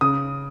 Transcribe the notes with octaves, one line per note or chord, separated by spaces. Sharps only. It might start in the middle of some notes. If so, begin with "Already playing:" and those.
C#3 D#6